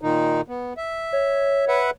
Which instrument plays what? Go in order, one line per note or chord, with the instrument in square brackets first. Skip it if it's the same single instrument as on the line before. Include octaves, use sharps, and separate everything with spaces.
[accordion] A#2 D#3 D#4
B3
E5
[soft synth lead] C#5
[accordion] B4 E5 F#5